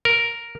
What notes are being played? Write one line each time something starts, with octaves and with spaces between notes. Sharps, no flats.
A#4